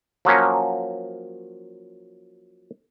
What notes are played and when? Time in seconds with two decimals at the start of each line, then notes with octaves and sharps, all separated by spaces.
0.25 F3 F#3 A#3 C#4